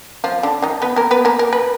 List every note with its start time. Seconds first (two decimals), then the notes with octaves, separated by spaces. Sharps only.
0.24 F3 F4
0.43 D3 D4
0.62 D#3 D#4
0.82 B3 B4
0.96 A#3 A#4
1.11 B3 B4
1.25 A#3 A#4
1.39 A#4
1.53 B4